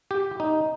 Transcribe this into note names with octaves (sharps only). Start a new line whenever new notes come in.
G4
D#4